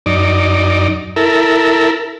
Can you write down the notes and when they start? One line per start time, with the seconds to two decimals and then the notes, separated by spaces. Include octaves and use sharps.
0.06 F#2 D#4 D5
1.16 E4 A4 A#4